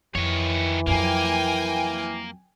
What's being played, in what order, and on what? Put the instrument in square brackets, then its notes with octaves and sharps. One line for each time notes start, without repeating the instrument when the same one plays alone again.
[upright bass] F2 [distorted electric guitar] D#3 C#5 [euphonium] E3
[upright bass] F2 F#3 [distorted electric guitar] A#3 [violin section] G5 G#5